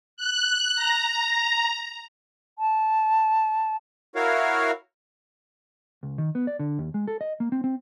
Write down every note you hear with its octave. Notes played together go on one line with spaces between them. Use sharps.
F#6
A#5
A5
E4 F#4 A#4 C#5 F5
C#2
D#3
B3
D5
D3
D#2
G#3
A4
D#5
A#3
C4
C4